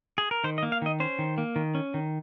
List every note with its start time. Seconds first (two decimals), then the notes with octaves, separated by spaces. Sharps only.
0.18 G#4
0.31 A#4
0.44 D#3 C5
0.58 D#5
0.63 A#3
0.72 F5
0.82 D#3 D#5
1.00 C#4 C5
1.19 D#3
1.38 A#3
1.56 D#3
1.75 C#4
1.94 D#3